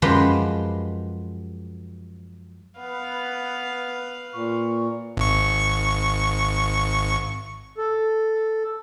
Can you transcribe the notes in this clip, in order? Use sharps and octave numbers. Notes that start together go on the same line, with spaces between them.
F#2 F3 G#3 G4 B4 C6
B3 B4 F5
A#2 C#6
G#1 C#6
A4